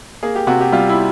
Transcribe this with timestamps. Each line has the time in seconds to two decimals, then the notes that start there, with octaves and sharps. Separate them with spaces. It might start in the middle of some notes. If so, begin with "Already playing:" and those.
0.23 A#3 G#4
0.35 G4
0.47 C3 F#4
0.60 G4
0.72 G3 F4
0.89 E4